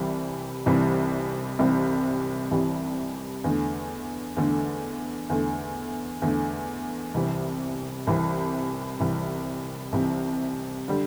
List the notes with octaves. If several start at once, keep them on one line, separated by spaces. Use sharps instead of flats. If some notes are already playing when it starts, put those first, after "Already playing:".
Already playing: C2 C3 E3 G3
C2 C3 E3 G3
C2 C3 E3 G3
C2 C3 E3 G3
E2 D3 A3
E2 D3 A3
E2 D3 A3
E2 D3 A3
C2 C3 E3
C2 C3 E3
C2 C3 E3
C2 C3 E3
D3 G3